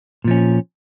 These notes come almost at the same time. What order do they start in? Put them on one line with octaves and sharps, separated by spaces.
A#2 F3 C#4